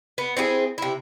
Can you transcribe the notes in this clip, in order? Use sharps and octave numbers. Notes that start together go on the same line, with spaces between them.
B3
C4 E4 F4 G#4
C3 E4